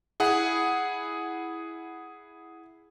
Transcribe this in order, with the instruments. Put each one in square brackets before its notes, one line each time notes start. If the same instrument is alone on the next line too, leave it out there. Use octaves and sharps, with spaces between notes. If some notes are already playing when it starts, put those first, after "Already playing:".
[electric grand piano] E4 G#4 F#5